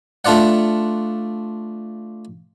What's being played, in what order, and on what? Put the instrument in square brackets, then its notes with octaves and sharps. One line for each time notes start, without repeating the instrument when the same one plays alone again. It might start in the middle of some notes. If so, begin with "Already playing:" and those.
[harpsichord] A3 D4 F4 D5 F#5